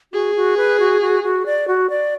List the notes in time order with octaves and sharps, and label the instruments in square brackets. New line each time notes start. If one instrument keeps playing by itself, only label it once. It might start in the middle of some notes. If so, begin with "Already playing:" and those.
[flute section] F#4 [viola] G#4
[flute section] F#4
B4
F#4
F#4
F#4
D5
F#4
D5